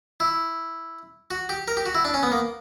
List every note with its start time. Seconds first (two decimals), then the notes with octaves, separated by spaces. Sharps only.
0.20 E4
1.31 F#4
1.49 G4
1.68 A#4
1.77 G4
1.86 F#4
1.95 E4
2.05 D4
2.14 C#4
2.23 B3
2.32 A#3